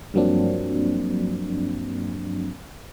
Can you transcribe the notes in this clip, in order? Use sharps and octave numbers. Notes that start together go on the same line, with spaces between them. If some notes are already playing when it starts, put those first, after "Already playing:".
G2 F3 F#3 A#3 C4 D4